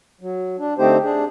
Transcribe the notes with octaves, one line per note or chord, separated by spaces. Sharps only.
F#3
D4
D3 A3 C4 D#4 G4 C5
D4 G#4